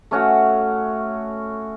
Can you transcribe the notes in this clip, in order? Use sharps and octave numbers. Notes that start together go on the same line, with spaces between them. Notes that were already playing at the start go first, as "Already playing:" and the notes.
A3 C#4 F#4